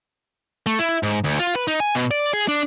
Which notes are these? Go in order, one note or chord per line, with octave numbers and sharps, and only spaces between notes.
A3
E4
G#2
D2
F4
B4
D#4
G#5
B2
D5
G#4
D4